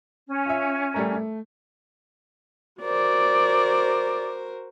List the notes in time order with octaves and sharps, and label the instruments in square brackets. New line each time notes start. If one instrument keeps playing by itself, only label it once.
[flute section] C#4
[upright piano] F4 E5
G3 A3 A#4
A3
[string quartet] F#4 A#4 C5 [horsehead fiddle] D5